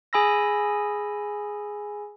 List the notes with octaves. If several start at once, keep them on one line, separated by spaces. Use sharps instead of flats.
G#4 G#5 B5 E6 A#6